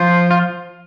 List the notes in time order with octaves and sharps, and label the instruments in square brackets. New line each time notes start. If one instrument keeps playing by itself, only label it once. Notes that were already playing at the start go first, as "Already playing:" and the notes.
Already playing: [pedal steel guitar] F3 F4 [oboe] C5
[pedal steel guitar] F4